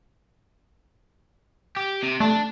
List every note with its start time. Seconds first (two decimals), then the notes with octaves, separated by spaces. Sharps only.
1.76 G4
2.03 C3
2.20 A3 D4